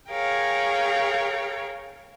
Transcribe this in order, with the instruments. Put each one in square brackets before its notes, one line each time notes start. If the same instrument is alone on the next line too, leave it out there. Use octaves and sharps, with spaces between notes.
[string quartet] G#4 A#4 C#5 F5 G5